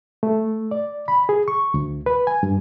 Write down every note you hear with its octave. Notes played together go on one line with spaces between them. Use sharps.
A3
D5
B5
G#4
C#6
D2
B4
G#5
G2